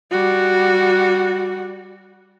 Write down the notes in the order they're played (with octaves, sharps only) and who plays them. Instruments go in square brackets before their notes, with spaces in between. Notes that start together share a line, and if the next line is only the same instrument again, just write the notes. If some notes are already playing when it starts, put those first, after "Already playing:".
[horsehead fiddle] G3 F#4